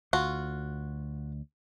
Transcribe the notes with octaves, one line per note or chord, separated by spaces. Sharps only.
D2 F4 F#4